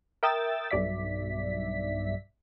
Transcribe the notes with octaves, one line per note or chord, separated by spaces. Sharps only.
A#4 E5 G5 D#6 E6 A6
B1 G2 D5 E5 B6